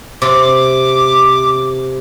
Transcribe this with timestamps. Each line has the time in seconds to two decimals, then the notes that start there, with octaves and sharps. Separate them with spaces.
0.22 C3 D6